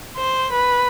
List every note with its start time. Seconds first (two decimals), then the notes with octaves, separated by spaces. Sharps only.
0.17 C5
0.52 B4